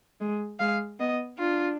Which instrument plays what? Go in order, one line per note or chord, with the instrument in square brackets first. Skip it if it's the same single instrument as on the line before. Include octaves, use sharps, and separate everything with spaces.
[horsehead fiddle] G#3
[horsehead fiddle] G#3 [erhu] F5
[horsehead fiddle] B3 [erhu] D#5
[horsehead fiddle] D4 [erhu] F4